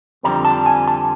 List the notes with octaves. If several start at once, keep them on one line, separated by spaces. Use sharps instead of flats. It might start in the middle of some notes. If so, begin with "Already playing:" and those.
F2 D3 G3 C4 A#5
A5
G#5
A5